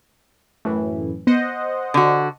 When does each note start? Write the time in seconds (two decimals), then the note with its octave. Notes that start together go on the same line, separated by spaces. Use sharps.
0.65 F#2 A2 E3 A3
1.27 B3 C5 D#5 F#5
1.94 D3 F#4